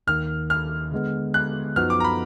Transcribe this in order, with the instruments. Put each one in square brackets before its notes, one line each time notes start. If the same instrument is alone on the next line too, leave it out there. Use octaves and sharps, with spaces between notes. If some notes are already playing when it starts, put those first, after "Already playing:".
[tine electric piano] D#2 D#3 A#3 [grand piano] F6
[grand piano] F6
[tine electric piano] D3 G#3 B3
[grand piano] F#6
[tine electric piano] F#2 F3 B3 D#4 F#4 [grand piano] F6
[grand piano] D6
A#5
B5